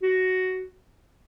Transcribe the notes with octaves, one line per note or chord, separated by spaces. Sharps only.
F#4